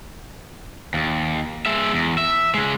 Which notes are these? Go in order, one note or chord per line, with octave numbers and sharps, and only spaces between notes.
D#2
G#3 E5
E2
E5
C#3 G#3